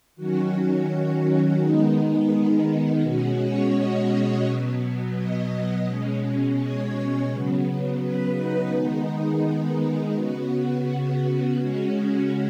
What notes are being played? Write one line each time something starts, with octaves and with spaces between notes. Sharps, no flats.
D#3 F#3 C#4 F#4
D#3 G#3 B3 D#4
B2 G#3 C#4 F#4
C#5
D#5
B2 F#3 B3
D#5
B2 G#3 C#4
C#5
C#3 F#3 B3
B4
D#4
D#3 G#3 B3
C#3 B3 F#4
C#3 G#3 C#4 F#4